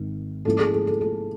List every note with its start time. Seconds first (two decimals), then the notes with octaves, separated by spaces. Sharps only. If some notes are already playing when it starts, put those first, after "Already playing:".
Already playing: G#1 D#3
0.45 G#2 F3 A#3 C#4 E4 A4
0.60 G#4
0.73 G#4
0.87 A4
1.01 A4